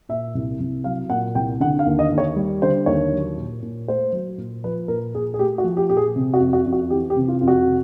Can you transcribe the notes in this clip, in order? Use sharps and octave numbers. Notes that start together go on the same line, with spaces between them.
A#2 E5
C2
C2
F#3 F5
A#2 F#5
C2 G5
D3 F#5
F5
D#2
D#5
D#2
C#5
G3
D3 C5
D#2 C#5
F#3
A#2
A#2
A3 C5
F#3
A#2
F3 B4
A#2 A#4
A#2 G#4
G#4
A3 G4
F#4
F3
G4
A#2 G4
G#4
C3
F#4
F2
F#4
F2
F#4
E3 G4
G4
C3
F4
F2 F4
F#4
C3